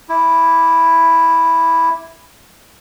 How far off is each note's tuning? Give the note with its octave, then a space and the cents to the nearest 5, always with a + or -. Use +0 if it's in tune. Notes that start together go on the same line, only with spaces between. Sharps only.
E4 +0 D6 +0